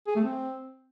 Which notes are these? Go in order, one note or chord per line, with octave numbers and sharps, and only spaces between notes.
G#4
A3
C4